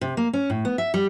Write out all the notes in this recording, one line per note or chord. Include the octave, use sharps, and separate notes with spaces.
C3
A#3
C#4
A2
B3
E5
G3